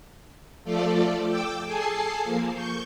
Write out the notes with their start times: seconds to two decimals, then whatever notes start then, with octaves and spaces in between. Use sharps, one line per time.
0.64 F3 A3 F4 A4 D5
1.26 G5 D6 E6
1.66 G#4 A4 G#5 A5 C7
2.23 F3 A#3
2.53 C#6 G6